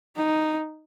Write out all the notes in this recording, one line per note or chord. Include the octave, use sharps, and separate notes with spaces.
D#4